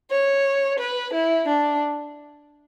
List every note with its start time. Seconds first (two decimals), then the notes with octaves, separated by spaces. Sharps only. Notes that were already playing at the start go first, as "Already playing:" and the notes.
0.11 C#5
0.79 B4
1.14 E4
1.48 D4